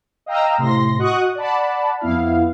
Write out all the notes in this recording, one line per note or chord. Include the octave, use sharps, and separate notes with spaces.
D#5 F5 G5 A#5 E6
A2 C3 C6 A#6
F#4 D#5 F#5 C#6 D#6 F#6
D5 F#5 A5 B5
F2 B3 E4 F5